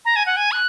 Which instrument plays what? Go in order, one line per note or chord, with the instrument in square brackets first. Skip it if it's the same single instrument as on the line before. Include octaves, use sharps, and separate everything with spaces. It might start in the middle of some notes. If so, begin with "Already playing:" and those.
[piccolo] A#5
G#5
F#5
G#5
F#6